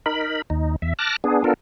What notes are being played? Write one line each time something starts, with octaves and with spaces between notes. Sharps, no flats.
D#4 A#4 B5
D#2 D#4
E2 E5
A5 D6 F6 F#6 A#6
B3 D4 G#4
B3 D4 F4 A4 A#4